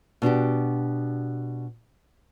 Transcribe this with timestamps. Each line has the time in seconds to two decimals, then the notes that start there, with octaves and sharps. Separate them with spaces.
0.22 B2 D4 F#4 G4